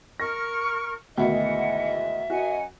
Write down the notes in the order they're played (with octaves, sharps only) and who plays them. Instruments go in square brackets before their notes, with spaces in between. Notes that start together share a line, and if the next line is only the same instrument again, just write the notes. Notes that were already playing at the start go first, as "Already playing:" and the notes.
[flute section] A#4 C#6 F6 [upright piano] A#6
[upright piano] D2 B2 D#3 [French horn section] E3 G#3 D#5 [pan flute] E5 [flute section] F#5
[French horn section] F#2 D#5 [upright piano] F#4 [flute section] F#5 G#5